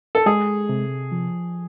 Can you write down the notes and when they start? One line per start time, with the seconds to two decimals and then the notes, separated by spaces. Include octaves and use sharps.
0.15 A4
0.26 G#3 G#4
0.69 C3
1.12 F3